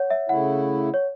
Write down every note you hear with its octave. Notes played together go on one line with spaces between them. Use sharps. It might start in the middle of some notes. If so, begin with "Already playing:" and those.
Already playing: C#5 F#5
E5
C#3 A3 E4 F#5
C#5